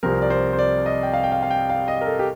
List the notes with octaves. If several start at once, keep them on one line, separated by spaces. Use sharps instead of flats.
C2 C3 F3 C4 A#4
D5
C5
C5
D5
D#5
G5
F5
G5
F5
F5
G5
F5
D#5
A#4
A4
G4